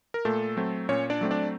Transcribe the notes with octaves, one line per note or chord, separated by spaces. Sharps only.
A#4
A#2 A3 A4
F#3 A3 C4
A#2 C#4 C#5
D4 D5
F#3 A3 C4
D4 D5